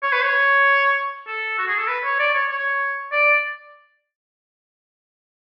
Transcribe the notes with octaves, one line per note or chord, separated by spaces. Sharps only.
C#5
B4
C#5
A4
F#4
G#4
A4
B4
C#5
D5
C#5
C#5
D5